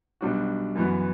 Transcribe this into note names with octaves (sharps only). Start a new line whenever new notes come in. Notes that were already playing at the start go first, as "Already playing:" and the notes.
B1 B2 G3 D4 F#4
F#2 E3 B3 F#4